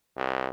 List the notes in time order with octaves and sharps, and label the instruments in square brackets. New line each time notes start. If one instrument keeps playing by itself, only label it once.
[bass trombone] C2